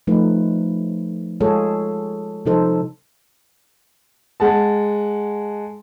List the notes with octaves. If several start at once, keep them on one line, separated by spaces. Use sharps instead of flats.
F3 A3 D#4 B4
G#3 F4 G#4 A4 C#5
C3 F3 D#4 A4 C5
G#3 F#5 A5